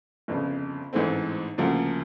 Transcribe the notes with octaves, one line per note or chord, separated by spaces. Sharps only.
G1 F2 C#3
A1 G#2 E3 A3 C4
D2 C#3 F3 A#3